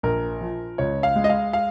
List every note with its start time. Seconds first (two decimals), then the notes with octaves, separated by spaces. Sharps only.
0.03 A#1 A#4
0.41 F3
0.78 C#2 C#5
1.03 F5
1.16 G#3
1.24 D#5
1.29 F5
1.53 F5